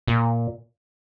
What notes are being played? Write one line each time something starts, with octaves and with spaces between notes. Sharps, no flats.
A#2